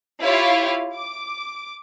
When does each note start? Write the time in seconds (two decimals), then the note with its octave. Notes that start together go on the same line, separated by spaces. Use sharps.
0.21 E4 F4 G4 C#5 F5
0.95 D6